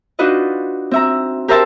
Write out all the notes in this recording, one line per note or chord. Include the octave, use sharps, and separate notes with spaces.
D4 D#4 F4 F#4 B4 D#5
C4 E5 A#5
G4 A#4 C5 E5 A5 A#5